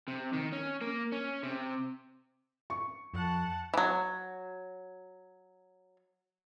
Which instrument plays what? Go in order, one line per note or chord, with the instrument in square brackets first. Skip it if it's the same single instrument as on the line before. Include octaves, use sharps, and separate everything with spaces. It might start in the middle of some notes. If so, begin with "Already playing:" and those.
[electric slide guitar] C3
D#3
C#4
A#3
C#4
C3
[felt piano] C#6
[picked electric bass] F2 [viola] F#5 A5
[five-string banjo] E3 F#3